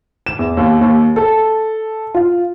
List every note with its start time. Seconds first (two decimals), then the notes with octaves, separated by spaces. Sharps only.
0.26 E7
0.39 E2
0.57 D#2
0.81 D#2
1.16 A4
2.14 F4